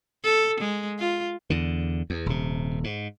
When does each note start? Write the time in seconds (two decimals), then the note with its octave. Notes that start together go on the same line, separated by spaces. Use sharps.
0.24 A4
0.61 G#3
0.99 F4
1.50 E2 D3
2.10 E2
2.26 D#1 C3
2.84 G#2